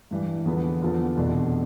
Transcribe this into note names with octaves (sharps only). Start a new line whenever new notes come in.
G2 E3 G3
E2 D3 F3 B3
E2 D3 F3 B3 F4
F1 E2 B2 A3 D4